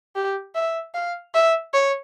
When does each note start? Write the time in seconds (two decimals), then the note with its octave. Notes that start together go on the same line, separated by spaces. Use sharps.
0.16 G4
0.55 E5
0.94 F5
1.34 E5
1.74 C#5